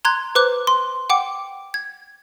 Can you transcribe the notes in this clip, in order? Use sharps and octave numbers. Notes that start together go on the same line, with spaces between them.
A#5 C6 F#6 G#6
B4 C5 D6 F#6
C6
F#5 G5 D6
G#6